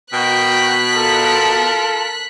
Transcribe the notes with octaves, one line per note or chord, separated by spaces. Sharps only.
B2 F#4 A#4 G5 F#6 B6
F4 A4 A#4